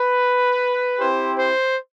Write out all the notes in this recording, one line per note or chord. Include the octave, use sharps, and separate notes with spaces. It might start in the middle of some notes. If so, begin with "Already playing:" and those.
Already playing: B4
C4 E4 G4 C5
C5